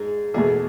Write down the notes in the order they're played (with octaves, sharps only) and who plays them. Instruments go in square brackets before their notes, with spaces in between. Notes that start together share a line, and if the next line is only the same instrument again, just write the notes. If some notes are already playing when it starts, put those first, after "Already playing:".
Already playing: [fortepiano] G#2 G#3 G#4
E2 B2 A3 G#4